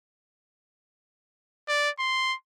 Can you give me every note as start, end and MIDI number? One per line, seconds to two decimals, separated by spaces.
1.68 1.90 74
1.99 2.35 84